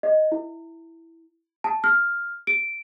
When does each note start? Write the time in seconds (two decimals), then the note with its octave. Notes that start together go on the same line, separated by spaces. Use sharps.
0.03 D#5
0.32 E4
1.64 A5
1.84 F6
2.47 D7